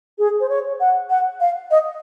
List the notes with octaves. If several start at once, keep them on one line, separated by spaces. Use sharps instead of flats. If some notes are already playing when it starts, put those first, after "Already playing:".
G#4
C5
C#5
F#5
F#5
F5
D#5